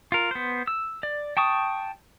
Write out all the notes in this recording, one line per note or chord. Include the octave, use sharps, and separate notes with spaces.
F4 A#4
B3 C5
E6
D5
G5 A5 C#6 D#6